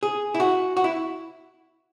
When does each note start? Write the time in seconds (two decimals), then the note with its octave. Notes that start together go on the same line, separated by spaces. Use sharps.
0.03 G#4
0.34 E4
0.40 F#4
0.77 F#4
0.84 E4